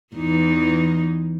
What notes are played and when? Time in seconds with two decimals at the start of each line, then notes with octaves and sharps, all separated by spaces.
0.15 E2 E3 D#4